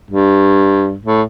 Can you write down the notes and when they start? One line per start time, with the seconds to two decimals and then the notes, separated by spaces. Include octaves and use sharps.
0.11 G2
1.05 A2